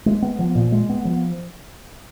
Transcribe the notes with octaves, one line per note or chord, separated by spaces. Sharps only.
G#3
B3
F3
A#2
G#3
B3
F3